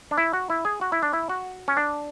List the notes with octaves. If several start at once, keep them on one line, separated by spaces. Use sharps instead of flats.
D4
E4
F#4
E4
G#4
F#4
E4
D4
E4
F#4
C#4
D4